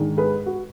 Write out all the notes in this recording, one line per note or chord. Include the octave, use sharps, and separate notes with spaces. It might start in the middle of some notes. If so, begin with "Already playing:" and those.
Already playing: G#2 D#3 G#3 D4
G#4 B4
F#4